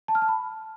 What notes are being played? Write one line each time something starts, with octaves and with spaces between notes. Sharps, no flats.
A5
F6
A5
B5